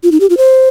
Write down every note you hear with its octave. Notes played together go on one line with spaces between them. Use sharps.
F4
D#4
G4
F4
C5